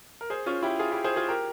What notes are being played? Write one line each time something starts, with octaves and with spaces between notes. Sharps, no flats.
A#4
G#4 C5
C#4 F4
E4 G4
F4 G#4
E4 G4
G#4 C5
F4 G#4
G4 A#4